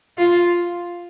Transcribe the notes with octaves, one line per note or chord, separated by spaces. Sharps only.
F4